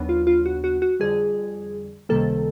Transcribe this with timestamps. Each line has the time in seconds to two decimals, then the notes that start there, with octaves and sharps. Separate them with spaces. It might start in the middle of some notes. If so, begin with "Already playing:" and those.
Already playing: D#2 C#3 F#3 B3 D4
0.09 F4
0.27 F4
0.46 F#4
0.64 F#4
0.82 F#4
1.00 F2 D3 G3 G#4
2.09 C#2 C3 D#3 G3 A#3 A4